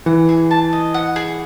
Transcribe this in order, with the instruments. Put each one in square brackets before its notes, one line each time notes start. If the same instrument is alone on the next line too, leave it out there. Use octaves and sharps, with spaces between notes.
[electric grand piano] E3 [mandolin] F#5
[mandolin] G#4
A5
D#5
F#5
G#4